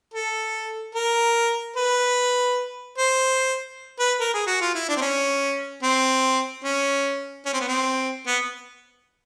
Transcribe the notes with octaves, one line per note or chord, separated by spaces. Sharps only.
A4
A#4
B4
C5
B4
A#4
G#4
F#4
F4
E4
D4
C4
C#4
C4
C#4
C#4
C4
B3
C4
B3